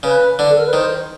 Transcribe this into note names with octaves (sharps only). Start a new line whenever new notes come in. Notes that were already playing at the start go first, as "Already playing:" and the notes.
C#3 B4
D3
A4
A#4
B4
D#3 C5